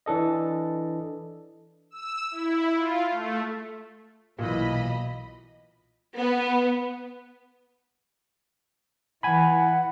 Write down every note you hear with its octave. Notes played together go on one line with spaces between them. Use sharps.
E3 D4 A4 D#5
E6
E4
F4
A3
B1 A#2 E3 D#5 B5
B3
E3 F#5 G#5 B5